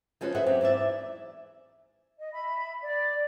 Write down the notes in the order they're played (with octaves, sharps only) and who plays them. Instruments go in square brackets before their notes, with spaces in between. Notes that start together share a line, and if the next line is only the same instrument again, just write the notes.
[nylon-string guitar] F3 G#3 C#4 F#4 B4
G#4 B4 C5 D#5 E5 F#5
F#3 C4 C#4 G4
G#2 E3 D5 E5
[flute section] D#5
E5 B5
D5